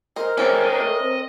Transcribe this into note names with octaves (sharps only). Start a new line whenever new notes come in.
A#4 C5 D#5
D#3 G#3 C#4 G4 A4 C5
D4 D#5
A3 D#5
C4